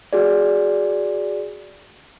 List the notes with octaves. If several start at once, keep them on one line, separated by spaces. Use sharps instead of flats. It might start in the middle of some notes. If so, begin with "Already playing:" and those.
F#4 G#4 D5